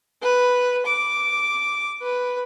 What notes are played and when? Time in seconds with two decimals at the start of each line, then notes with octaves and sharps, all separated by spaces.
0.23 B4
0.86 D6
2.02 B4